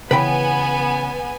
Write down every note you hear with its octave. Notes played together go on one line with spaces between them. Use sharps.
C#3 E3 B3 C#4 B4 G5 G#5 B5